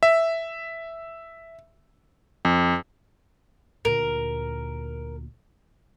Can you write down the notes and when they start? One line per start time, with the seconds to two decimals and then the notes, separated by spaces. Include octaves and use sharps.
0.03 E5
2.45 F2
3.85 D2 A#2 A#4